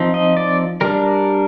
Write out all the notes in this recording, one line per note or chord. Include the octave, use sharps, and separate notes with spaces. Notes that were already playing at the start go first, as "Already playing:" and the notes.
Already playing: F3 C4 D#4
D#5
D5
G3 D4 A#4